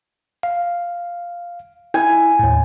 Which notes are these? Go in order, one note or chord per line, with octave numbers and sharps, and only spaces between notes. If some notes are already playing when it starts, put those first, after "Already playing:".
F5
E4 G#5
D#2 A2